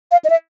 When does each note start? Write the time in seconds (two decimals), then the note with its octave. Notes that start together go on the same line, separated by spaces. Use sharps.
0.11 F5
0.25 D#5
0.30 E5